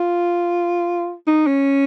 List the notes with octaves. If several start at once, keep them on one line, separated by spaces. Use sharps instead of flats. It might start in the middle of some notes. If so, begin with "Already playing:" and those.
Already playing: F4
D#4
C#4